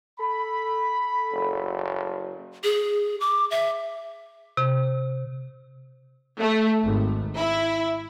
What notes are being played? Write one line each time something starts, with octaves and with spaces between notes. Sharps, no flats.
A4 B5
F#1
G#4
D6
E5
C3
A3
G#1
E4